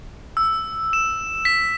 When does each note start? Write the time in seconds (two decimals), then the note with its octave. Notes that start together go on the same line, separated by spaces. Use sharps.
0.37 E6
0.93 E7
1.45 B6